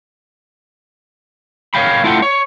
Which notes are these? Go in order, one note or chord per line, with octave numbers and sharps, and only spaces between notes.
A#4 C#5 D5 F5 G5 B5
A3 E4 F4 A4 F#5 G5
C#5